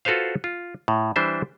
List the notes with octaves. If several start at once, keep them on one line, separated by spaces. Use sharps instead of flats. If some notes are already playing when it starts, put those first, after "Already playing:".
F4 F#4 A4 B4 C5 F5
F4
A2
E3 G3 D4 C5 E5